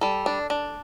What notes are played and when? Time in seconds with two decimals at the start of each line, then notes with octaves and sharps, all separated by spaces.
0.01 G3 A4
0.26 D4
0.50 D4